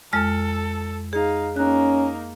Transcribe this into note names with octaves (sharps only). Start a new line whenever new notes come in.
F2 G#3 A4 F6
D#4 G#4 F5
A#3 C#4 D#4 F#6